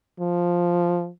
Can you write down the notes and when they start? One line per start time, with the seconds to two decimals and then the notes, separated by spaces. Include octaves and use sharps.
0.20 F3